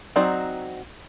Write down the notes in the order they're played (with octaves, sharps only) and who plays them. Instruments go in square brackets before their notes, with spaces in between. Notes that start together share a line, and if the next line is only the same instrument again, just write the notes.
[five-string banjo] F#3 C4 D#4 F#4 D5